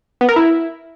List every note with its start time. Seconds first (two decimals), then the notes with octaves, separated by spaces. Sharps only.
0.21 B3
0.29 A#4
0.36 E4